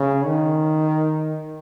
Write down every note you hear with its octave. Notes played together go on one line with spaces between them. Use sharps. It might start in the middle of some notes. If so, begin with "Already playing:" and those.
Already playing: C#3
D#3